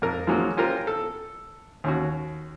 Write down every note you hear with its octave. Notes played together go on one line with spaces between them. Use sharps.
F2 A#4
F3 F#3 G#3 A#3 C#4 F#4
C#4 F4 G4 A#4 C5
A4
D#2 C#4 F#4